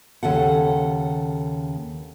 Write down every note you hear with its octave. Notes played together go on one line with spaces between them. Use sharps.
D#2 C#3 A4 F#5